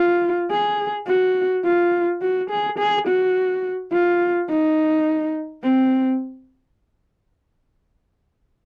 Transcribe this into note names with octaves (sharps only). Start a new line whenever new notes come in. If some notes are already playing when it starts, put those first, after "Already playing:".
Already playing: F4
G#4
F#4
F4
F#4
G#4
G#4
F#4
F4
D#4
C4